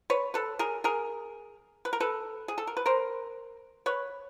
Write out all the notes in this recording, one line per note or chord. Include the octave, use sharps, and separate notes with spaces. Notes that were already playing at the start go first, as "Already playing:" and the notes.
B4 C#5
A4 B4
G#4 A#4
G#4 A#4
B4
A#4
A4 B4
G#4
A4
A#4
B4
A#4 C5
B4 C#5